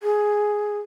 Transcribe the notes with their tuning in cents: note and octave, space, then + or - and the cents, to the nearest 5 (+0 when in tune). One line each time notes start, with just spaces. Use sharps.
G#4 +5